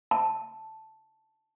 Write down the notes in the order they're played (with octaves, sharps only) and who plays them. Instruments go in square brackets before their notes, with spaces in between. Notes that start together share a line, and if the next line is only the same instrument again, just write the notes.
[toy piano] A5